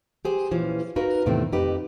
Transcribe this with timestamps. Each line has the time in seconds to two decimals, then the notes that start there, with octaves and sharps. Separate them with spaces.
0.25 G4 G#4 C5
0.51 A#2 E3 F3 C#4
0.96 D#4 F#4 A#4 B4 F5
1.26 E2 A2 C3 D#3 A3 C4
1.52 F2 D#4 G4 B4